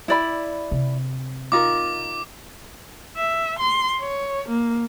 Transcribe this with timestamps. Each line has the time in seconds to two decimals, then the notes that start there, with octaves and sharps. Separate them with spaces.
0.08 E4 D5 B5
0.71 C3
1.52 D#4 F4 A#4 D6
3.17 E5
3.59 C6
4.01 C#5
4.48 A#3